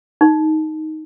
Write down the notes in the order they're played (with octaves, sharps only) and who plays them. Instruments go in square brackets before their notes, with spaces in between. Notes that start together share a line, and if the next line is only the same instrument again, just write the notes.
[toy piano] D#4